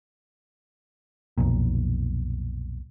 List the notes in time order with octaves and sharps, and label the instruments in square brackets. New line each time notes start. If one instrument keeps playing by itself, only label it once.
[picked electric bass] B1 F2 A#2